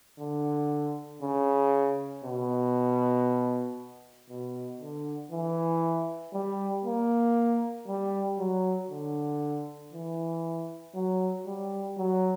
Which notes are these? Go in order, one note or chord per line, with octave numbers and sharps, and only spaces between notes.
D3
C#3
B2
B2
D3
E3
G3
A#3
G3
F#3
D3
E3
F#3
G3
F#3